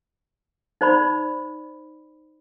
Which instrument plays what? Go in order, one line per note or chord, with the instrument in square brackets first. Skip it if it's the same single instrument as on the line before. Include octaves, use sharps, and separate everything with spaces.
[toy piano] D#4 C5 D5 B5